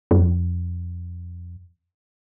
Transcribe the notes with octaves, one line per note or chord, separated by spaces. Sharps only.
F#2
F2